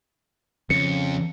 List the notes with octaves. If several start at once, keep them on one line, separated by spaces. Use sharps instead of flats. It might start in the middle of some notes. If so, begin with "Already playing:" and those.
F2 C#3 C#7